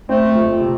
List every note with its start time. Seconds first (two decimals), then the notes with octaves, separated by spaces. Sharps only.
0.09 A3 C4
0.35 F2
0.60 C3